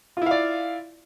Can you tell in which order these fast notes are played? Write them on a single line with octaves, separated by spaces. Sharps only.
F4 E4 F5 D5